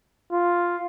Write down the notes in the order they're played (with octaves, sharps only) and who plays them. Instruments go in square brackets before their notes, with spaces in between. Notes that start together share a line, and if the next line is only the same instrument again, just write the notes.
[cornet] F4